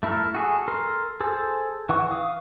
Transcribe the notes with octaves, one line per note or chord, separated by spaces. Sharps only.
A3 E4 A4 A#4
F#4 G#4 A4
A4 A#4 C6
G#4 A4 C5
E3 F#5 C#6
F5 D#6